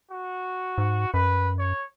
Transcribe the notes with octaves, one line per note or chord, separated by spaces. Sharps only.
F#4
G#2
F#2 B4
C#5